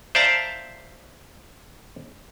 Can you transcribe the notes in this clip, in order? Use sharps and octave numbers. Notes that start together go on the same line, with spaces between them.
C5 D5 E5 F5 A5 A#5